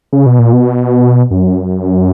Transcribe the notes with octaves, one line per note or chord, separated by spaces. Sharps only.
C#3
B2
A#2
B2
F#2